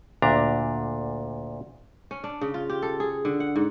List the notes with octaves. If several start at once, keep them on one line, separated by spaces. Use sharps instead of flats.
D2 A#2 D4 A#5
C#4
D4
C#3
F4
G4
A4
G#4
D3
F#5
G#2